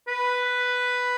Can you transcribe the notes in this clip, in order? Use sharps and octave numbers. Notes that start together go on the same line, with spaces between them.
B4